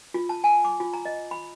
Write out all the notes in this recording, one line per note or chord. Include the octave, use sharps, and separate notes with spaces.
F4
A5
G#5
D6
F4
A#5
D#5
B5